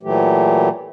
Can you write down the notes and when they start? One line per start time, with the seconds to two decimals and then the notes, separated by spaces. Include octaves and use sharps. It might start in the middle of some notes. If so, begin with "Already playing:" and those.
0.03 A#2 E3 F#3 A3 G4